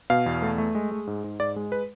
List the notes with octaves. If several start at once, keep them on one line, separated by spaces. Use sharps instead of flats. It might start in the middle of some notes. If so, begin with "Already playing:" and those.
B2 F5
E2
A3
A3
G#3
G#3
G#2
G#2
G#2 D5
G#3
B4